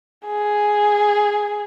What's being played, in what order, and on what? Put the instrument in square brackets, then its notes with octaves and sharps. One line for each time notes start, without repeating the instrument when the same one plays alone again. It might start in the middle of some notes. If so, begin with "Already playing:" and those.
[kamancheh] G#4